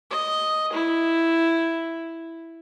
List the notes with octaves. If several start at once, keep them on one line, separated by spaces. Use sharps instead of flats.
D#5
E4